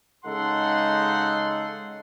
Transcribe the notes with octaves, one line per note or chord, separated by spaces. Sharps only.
C#3 G#3 D#4 A4 F#5 C6